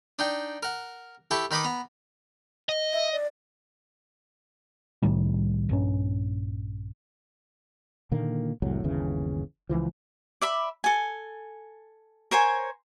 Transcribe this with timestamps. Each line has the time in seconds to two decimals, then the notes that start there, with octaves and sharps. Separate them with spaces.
0.19 D4 D#4 G5
0.63 A#4 F#5
1.31 E4 G4 A4 A5 C#6
1.51 D#3 D#4 B4 B5 D6 D#6
1.64 B3 A#5
2.69 D#5
2.93 E5
3.12 D5
5.02 C2 A2 D#3 G3
5.69 A#1 G2 C#4
8.12 A#2 D3 D#3 A#3
8.62 C2 F2 A2 F#3
8.84 G1 D#2 C#3 E3
9.69 C#2 C#3 E3 F3
10.41 D5 E5 B5
10.84 A4 G#5
12.31 A#4 C5 C#5 G#5